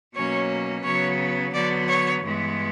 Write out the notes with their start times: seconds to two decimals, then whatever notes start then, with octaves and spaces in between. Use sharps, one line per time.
0.15 B2 F#3 A#3 C#4 C#5
0.84 C#3 F#3 B3 C#5
1.53 D3 F#3 B3 D5
1.88 C#5
2.23 G2 E3 G#3 B3